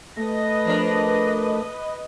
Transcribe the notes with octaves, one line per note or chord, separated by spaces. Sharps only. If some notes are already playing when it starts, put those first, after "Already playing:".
A3 B4 D#5 A#6
F3 D4 A#4